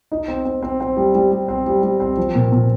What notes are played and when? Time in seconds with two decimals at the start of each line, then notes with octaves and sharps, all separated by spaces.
0.12 D#4
0.28 C4
0.45 C4
0.62 C4
0.80 C4
0.97 G3
1.15 G3
1.31 G3
1.48 C4
1.66 G3
1.83 G3
2.00 C4
2.17 F3
2.35 A#2
2.52 A#2